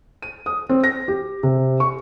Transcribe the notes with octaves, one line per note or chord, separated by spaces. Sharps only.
D#7
D#6
C4
A#6
G4
C3
C#6